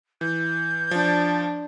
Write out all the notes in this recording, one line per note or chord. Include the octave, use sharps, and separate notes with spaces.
E3 G6
F3 D4